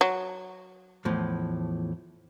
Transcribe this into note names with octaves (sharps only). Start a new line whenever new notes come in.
F#3
E2 A2 F3